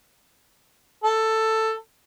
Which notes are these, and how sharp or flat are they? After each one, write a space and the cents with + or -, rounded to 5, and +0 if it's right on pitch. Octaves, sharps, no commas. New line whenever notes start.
A4 +10